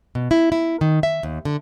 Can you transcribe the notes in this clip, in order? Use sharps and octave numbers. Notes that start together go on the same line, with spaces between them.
B2
E4
E4
D#3
E5
D#2
D3